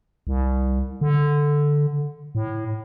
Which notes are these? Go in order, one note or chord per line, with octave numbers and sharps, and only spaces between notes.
C2
D3
A2